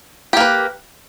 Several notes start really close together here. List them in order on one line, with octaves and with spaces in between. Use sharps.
G4 A#3 B4